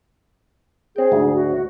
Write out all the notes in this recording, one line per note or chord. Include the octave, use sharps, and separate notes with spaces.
C4 G#4 G5
D2 G#2
F#4